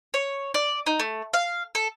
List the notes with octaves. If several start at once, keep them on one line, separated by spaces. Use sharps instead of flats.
C#5
D5
D#4
A3
F5
A4